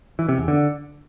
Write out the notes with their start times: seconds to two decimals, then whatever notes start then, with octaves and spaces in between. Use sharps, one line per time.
0.19 E3
0.29 C3
0.38 E2
0.48 D3